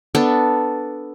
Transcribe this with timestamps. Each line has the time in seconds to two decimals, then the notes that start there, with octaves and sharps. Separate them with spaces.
0.15 B3 D4 A4